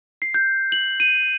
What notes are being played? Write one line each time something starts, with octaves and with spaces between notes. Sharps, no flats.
C7
G6
F#7
D#7